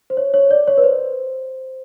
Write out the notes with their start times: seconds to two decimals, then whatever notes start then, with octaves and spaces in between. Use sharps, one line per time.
0.10 C5
0.17 C#5
0.34 C#5
0.51 D5
0.68 C#5
0.77 B4
0.84 C5